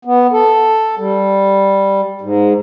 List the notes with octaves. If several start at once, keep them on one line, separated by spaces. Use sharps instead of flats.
B3
A4
G3
G#2